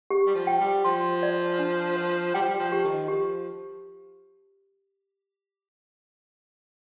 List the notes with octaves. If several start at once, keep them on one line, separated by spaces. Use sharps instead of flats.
G4
G3
F3
G5
G3
F3 C6
D5
D4
C5
G3 G5
F3
G3
F3
G4
D#3
F3 G4